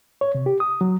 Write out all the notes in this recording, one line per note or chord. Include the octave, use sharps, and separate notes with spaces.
C#5
C3
G4
D#6
F#3